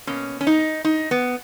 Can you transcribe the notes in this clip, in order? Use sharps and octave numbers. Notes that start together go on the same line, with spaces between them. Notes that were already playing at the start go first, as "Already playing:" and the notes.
B2 A#3 C#4
C#4
D#4
D#4
B3